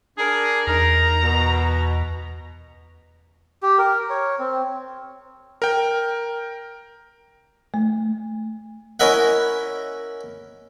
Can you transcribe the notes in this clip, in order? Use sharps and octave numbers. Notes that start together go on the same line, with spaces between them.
D4 G#4 A#4
E2 D#4 A#4 A#5
B2
G4
A#4
C#5
C4
A#4 G5
A3
C#4 E4 A#4 D#5 E5 F#5